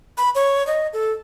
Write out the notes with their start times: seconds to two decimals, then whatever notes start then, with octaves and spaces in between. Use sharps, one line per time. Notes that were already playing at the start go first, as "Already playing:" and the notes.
0.18 B5
0.35 C#5
0.67 D#5
0.93 A4